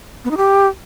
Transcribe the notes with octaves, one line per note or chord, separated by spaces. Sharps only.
B3
D#4
G4